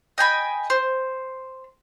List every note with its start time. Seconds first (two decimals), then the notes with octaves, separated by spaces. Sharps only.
0.18 D#5 G5 G#5 B5
0.70 C5